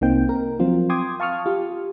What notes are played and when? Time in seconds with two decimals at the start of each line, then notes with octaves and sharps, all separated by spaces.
0.01 C2 A#3 C4 D#4 G5
0.29 A#4
0.60 F3 F#3 C4 F4
0.89 G5 C6 D6 D#6 G#6
1.20 F5 A5 C#6 D#6 F6
1.46 F4 G4